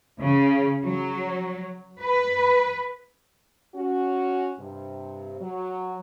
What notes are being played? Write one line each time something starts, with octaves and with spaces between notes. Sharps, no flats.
C#3
F#3
B4
C#4 F#4
G2 C3
F#3